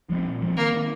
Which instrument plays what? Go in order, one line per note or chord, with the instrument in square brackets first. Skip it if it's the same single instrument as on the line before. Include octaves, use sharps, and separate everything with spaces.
[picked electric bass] F3 G#3 C4
A#2
F3 G#3 C4
[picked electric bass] D#3 [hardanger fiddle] A#3
[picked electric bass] G#3 C4